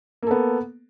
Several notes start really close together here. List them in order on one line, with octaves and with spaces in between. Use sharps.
A#3 A4 B3